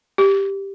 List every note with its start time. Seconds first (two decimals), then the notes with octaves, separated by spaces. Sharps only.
0.18 G4